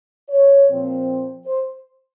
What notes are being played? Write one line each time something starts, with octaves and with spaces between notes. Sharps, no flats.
C#5
A#2 F3 C4
C5